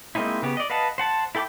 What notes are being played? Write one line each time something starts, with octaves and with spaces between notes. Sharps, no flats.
G#3 A#3 C4 D#4 E4
C#3 B3 G4
D5 D#5
B4 D#5 F5 F#5 A5
C5 F#5 A5
E4 A4 G5 B5 D6